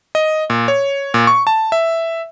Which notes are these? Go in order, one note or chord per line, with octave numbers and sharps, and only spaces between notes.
D#5
A#2
C#5
A#2
C#6
A5
E5